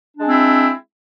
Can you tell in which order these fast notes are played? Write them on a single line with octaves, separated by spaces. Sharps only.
D4 G#3 C4 E4